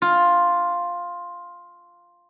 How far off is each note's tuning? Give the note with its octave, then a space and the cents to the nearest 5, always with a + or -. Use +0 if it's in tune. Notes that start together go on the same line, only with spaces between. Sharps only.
F4 +5